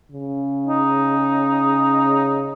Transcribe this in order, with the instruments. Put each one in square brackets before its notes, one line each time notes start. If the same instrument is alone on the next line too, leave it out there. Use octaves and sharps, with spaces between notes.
[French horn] C#3
[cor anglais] D#4